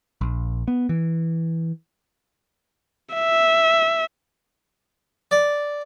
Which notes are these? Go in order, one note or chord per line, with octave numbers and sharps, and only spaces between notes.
A#1
B3
E3
E5
D5